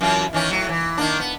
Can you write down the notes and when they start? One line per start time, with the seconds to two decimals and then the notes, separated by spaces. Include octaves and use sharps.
0.01 F#2 E3 F4
0.33 D#3 E3 C#4
0.51 A2 F#3
0.69 E3
0.98 D#3 A#3 D4
1.20 B3